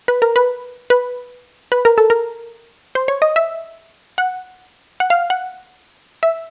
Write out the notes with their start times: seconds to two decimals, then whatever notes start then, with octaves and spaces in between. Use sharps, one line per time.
0.08 B4
0.22 A#4
0.36 B4
0.90 B4
1.72 B4
1.85 A#4
1.98 A4
2.10 A#4
2.95 C5
3.08 C#5
3.22 D#5
3.36 E5
4.18 F#5
5.00 F#5
5.10 F5
5.30 F#5
6.23 E5